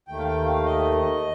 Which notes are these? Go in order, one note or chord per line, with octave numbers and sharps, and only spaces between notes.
D#2 D#3 A3 G5
F5
G5
F5
D#5